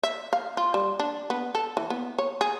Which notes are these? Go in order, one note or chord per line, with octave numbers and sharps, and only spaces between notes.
E5
F5
F4
G3
D4
B3
A4
E3
B3
C#5
G#4